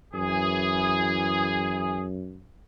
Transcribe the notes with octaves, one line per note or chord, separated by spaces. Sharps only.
F#2 E3 G#4